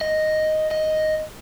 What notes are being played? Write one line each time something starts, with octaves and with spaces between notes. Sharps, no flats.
D#5
D#5